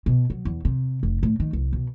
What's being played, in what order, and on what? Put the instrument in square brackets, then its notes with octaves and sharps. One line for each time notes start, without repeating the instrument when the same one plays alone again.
[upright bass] B2
F#3
E2
C3
F1
A2
D#3
C2
B2